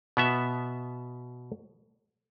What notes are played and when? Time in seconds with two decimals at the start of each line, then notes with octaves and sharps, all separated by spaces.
0.17 B2 B3 E5